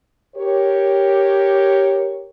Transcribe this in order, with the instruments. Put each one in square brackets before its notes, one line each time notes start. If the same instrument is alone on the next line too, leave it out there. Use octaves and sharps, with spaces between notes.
[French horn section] G4 A#4 C#5